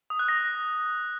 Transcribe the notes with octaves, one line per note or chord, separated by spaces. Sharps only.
D#6
F#6
A#6